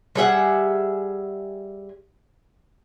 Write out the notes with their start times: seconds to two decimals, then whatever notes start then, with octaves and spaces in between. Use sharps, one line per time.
0.15 G3 G#4 E5 F#5